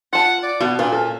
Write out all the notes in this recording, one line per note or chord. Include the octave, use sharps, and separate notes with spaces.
F4 F#5 A5
D5
B2 F#4
A#2 D4 B4
C#4 A4